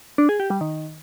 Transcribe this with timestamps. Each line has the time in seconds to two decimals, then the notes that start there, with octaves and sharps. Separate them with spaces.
0.18 D4
0.29 G#4
0.40 G4
0.50 G3
0.61 D#3